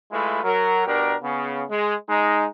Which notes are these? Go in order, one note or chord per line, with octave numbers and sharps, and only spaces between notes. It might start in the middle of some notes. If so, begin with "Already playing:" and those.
G#3 A3 E4 F4 B4
F#3 A#4
B2 D4 G4 A#4
C#3 B3
G#3
G#3 D#4